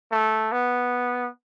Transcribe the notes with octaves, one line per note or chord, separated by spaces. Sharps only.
A3
B3